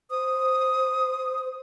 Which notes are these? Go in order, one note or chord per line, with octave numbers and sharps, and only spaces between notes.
C5 D#6